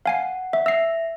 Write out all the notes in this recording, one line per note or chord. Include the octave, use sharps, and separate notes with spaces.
F5 F#5 G#5 C7
E5
E5 E6 C7